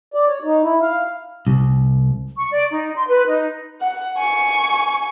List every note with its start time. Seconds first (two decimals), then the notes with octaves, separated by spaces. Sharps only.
0.14 D5
0.28 C#5
0.43 D#4
0.63 E4
0.82 F5
1.47 C2
2.37 C#6
2.51 D5
2.72 D#4
2.95 C6
3.07 B4
3.28 D#4
3.81 F#5
4.17 G#5 C#6